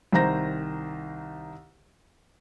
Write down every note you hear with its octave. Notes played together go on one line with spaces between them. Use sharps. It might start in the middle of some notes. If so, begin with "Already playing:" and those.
C2 D#3 C5 A#5 A#6